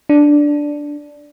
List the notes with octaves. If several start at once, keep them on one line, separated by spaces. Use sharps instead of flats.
D4